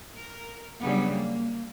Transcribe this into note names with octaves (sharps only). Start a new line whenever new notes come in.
A#4
C#3 F#3 G3 B3 D4
A#3